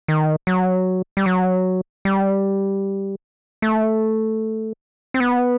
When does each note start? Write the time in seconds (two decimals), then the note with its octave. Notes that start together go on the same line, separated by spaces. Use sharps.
0.08 D#3
0.47 F#3
1.17 G3
1.26 F#3
2.05 G3
3.62 A3
5.14 C4
5.20 B3